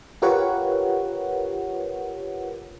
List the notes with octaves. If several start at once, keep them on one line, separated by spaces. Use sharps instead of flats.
F4 G4 A#4 B4 C#5 F#5